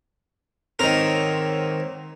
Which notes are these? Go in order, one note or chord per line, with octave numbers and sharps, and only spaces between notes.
G#2 D#3 C4 A#4 C#5